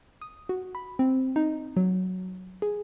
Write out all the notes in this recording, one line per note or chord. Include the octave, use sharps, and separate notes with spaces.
D#6
F#4
B5
C4
D#4
F#3
G#4